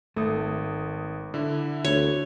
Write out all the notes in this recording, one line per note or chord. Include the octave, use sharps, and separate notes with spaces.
G#1 A3 D#6
D3 E4
D2 C#5